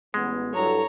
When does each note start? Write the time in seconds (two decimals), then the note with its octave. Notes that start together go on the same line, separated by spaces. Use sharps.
0.14 A1 G#3 B3
0.54 G2 F#3 E4 A4 C#5 A#5